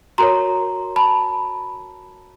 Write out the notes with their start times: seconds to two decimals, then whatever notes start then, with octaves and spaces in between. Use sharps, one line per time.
0.18 F#4 A#4 C#5 A#5 C6
0.96 A5 B5